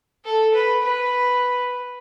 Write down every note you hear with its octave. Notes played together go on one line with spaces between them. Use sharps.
A4
B4
B4